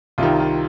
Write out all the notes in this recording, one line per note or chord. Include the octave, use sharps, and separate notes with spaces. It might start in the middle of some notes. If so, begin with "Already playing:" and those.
C2 C3 D#3 F4
F4